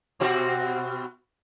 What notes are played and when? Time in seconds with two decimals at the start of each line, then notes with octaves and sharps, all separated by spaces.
0.20 B2 C4 F#4